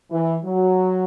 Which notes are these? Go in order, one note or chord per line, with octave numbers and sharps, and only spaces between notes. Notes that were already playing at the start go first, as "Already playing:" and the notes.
E3
F#3